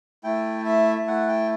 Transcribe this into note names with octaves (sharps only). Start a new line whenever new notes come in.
A3 E4 G5
E5
E5
F#5
G5